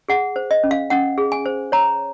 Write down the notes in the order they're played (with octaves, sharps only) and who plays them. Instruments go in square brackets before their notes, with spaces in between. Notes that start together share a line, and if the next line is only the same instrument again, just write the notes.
[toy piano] G#4 F#5
C5
D#5
C#4
F5
C#4 F#5
G#4
G#5
C5
C#5 A#5